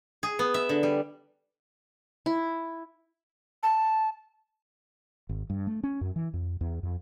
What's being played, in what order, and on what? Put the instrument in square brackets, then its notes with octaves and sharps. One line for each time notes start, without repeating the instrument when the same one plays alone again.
[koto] G#4
B3
E5
D3
G3
[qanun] E4
[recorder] A5
[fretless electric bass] G#1
G2
A3
C#4
F#2
E3
F2
E2
F2